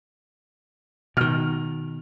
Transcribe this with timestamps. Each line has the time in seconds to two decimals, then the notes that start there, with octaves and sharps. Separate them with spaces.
1.17 B2 D#3 F6